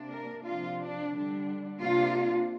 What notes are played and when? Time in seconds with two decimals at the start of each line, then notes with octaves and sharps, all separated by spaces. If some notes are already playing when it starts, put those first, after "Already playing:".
Already playing: C3 A#3 D4
0.10 A#4
0.43 C3 F3 D4 F4
0.77 D4
1.11 D3 G3 D4
1.79 C3 A#3 D4 F4